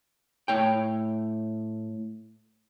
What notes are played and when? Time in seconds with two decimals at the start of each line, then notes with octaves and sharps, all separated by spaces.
0.48 A2 C#5 G5